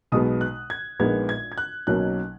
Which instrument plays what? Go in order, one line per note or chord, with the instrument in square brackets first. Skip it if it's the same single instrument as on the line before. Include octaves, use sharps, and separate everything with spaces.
[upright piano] B1 B2 G#3 B3 D#6
F#6
G#6
A#1 A#2 G#3 B3 D#4 G#6
G#6
G#6
F#6
B1 B2 F#3 A#3 C#4 F#6